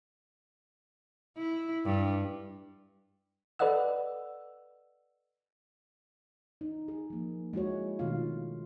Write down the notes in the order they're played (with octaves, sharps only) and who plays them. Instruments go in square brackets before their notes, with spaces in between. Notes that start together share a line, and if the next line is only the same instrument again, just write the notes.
[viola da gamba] E4
G2
[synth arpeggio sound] A4 B4 D5 D#5 F#5 E6
[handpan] D#4
G#4
F3 A#3
G#3 E4 F#4 C#5
B2 D#3 A3 D4 F4 F5